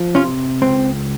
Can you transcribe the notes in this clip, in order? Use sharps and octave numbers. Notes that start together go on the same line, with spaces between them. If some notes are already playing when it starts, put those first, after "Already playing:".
Already playing: F3
C3 C#4 F4
C#2 C4